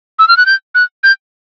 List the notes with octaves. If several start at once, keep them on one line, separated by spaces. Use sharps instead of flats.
E6
F6
F#6
G6
F#6
G6